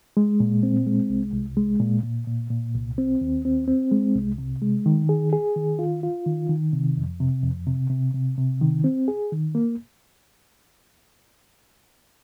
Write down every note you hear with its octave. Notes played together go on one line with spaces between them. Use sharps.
G#3
A#2
C4
G#3
C2
C2
G#3
A#2
A#2
A#2
A#2
C2
C4
D#2
C4
C4
G#3
C2
C3
G#3
D#3
G#4
G#4
D#3
F4
F4
D#3
D#3
C3
F2
C3
F2
C3
C3
C3
C3
D#3
C4
G#4
D#3
A#3